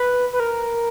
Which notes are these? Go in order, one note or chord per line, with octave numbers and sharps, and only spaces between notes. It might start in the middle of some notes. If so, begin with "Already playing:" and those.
Already playing: B4
B4
A#4